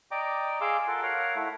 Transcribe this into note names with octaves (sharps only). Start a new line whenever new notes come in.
D5 D#5 G5 A#5 D6
G#4 F5 C6 D6 E6
F4 A4 A#4 F#5
A#4 C#5 F5 F#5 A#5
A3 E4 F#5